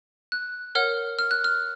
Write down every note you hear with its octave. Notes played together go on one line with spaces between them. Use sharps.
F#6
A#4 C#5 F#5 F6
F6
F#6
F6